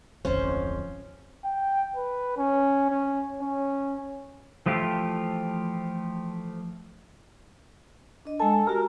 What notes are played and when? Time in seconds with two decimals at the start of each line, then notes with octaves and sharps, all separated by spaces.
0.25 D1 G#1 F2 C#4 C5
1.44 G5
1.96 B4
2.38 C#4
2.90 C#4
3.42 C#4
4.66 E3 F3 A3 F4 G4
8.25 D4 D#5
8.40 G#3 A4 G#5
8.67 F#4 G4 A#4